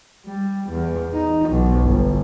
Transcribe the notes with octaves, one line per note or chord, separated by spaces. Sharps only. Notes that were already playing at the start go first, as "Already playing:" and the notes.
G3
E2
D#4
B1
G1